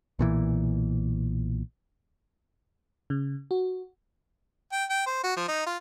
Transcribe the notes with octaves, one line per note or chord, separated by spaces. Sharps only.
B1 A#2 E3
C#3
F#4
G5
G5
C5
F#4
F3
D#4
F4